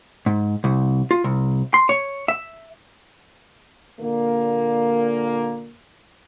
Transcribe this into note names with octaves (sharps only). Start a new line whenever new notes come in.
G#2
C2
F4
C2
C6
C#5
E5
A#2 D3 A#3